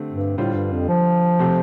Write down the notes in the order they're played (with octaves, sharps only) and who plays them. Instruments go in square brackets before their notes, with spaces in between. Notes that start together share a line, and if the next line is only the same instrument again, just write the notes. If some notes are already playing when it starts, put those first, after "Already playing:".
Already playing: [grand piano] D3 A3 C4 G4
[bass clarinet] G2
[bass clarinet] A2 [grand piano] D3 G3 F4 C5
[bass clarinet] G2
F2
F3
[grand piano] C3 A3 C4 G4 C5